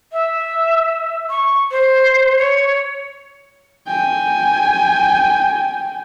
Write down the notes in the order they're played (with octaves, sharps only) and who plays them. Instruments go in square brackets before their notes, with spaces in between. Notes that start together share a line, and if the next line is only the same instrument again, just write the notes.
[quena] E5
C#6
C5
C#5
[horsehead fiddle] G5 G#5